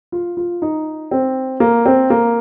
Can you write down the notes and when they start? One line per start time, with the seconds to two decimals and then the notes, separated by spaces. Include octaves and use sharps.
0.12 F4
0.37 F4
0.62 D#4
1.11 C4
1.60 A#3
1.86 C4
2.10 A#3